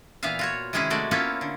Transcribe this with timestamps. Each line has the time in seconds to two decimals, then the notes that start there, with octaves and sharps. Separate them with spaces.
0.23 A#2 E3 B3 E5 F5
0.39 F4 F#4 C#5
0.73 C3 D#3 G#3 C#4 E4 G#4
0.90 G#3 A3 F#4 D5
1.11 A#3 B3 C#4 E4 F4 A4
1.41 D3